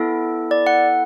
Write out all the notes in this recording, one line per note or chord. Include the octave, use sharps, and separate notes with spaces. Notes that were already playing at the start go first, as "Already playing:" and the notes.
Already playing: B3 E4 A4
D5
F#5